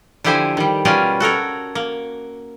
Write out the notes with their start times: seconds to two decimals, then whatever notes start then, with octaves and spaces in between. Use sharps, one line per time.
0.24 D3 F3 E4 G4 C5 G#5
0.57 D#3 G3
0.85 B2 G3 C#4 F4 A#4 G#5
1.20 F#4 A4 A#4 C#5
1.75 A#3